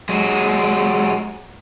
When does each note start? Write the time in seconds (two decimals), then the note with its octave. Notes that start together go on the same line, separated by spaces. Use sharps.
0.09 F#3 G#3